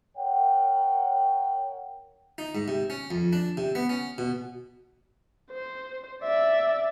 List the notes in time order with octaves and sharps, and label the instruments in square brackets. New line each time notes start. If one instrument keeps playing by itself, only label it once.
[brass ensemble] A#4 C#5 F#5 G5
[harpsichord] D#4
G#2
C3
C#4
F2
D4
C3
B3
C#4
B2
[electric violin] C5
D5 E5